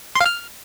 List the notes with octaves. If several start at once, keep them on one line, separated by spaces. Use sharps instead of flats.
C6
F5
F6